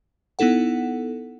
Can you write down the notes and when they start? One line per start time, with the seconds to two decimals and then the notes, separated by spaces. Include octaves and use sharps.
0.39 B3 D#4 E4 A4 F#5